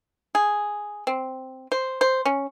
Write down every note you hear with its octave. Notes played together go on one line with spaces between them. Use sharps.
G#4
C4
C5
C5
C#4